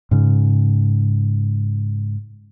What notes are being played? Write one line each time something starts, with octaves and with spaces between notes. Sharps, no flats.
G#2 C#3